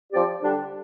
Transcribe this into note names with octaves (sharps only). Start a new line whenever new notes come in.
F3 C4 G4 D5
D3 G3 D4